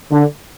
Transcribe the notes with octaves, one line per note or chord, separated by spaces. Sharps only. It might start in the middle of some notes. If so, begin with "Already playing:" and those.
D3